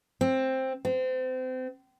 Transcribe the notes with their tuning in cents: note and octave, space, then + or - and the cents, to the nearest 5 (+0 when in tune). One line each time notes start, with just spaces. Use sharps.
C4 +10
C4 -30